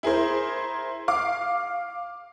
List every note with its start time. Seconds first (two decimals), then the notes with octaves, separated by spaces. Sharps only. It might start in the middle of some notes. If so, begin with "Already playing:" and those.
0.03 E4 G#4 A#4 C5
1.08 F5 D6